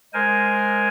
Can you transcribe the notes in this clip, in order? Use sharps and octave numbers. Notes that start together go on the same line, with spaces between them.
G#3 A#4 C5 G#5